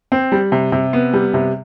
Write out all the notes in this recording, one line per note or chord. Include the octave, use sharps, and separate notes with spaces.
C4
G3
C3
C3
B3
G3
C3